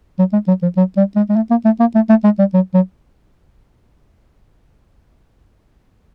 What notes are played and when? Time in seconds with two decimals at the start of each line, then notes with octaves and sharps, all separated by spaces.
0.19 F#3
0.33 G#3
0.48 F#3
0.62 F3
0.77 F#3
0.97 G3
1.16 G#3
1.29 G#3
1.36 A3
1.51 A#3
1.65 A3
1.80 A#3
1.95 A3
2.09 A3
2.24 G#3
2.39 G3
2.54 F#3
2.74 F#3